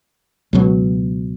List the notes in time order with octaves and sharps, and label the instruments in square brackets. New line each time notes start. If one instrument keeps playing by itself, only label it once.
[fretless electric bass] C#2 B2 F#3